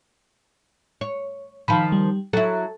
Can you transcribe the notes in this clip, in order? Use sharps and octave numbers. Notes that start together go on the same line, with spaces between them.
C#5
D#3 F3 F5 B5
G3
F#3 E4 A4